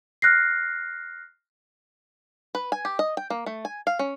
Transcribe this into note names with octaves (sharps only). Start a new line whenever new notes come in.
F6 F#6 A#6 C7
B4
G#5
G4
D#5
G5
A#3
A3
G#5
F5
C#4